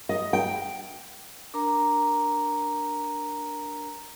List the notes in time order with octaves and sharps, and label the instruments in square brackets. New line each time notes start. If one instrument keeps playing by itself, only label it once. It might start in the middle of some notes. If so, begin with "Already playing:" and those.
[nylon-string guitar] D#5
G5
[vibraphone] D4 A#4 A#5